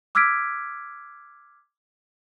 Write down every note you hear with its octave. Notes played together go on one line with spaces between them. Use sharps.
D6 E6 F6 G#6 B6 D7